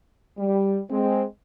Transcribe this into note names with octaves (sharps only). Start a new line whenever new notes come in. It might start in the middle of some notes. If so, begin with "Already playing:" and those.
G3
G#3 C4